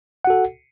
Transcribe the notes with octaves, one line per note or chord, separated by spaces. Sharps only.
F#4 A4 F#5